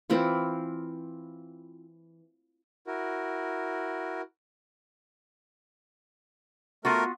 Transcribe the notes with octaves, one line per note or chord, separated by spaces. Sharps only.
E3 C4 E4 F4
E4 F#4 A#4
A3 B3 F4 F#4 A#4